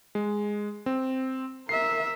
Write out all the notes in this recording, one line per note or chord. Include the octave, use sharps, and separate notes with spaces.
G#3
C4
A#4 E5 C7